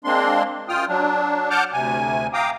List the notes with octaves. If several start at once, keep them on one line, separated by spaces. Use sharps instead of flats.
G#3 A#3 C4 D4 C6
F#2 F4 G5 D#6 F6
F#3 D4
F#5 A5 D6 F6 G6
D2 C3 G#5
F5 G5 A#5 D6 D#6